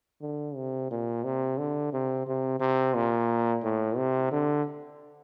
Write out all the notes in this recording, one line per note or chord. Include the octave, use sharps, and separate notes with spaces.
D3
C3
A#2
C3
D3
C3
C3
C3
A#2
A2
C3
D3